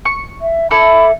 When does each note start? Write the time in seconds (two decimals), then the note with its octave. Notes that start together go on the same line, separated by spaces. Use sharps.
0.05 C#6
0.42 E5
0.71 E4 A4 D5 B5